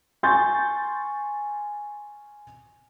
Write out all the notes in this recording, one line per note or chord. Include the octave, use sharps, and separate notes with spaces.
G#5 C6 C#6 G6 A6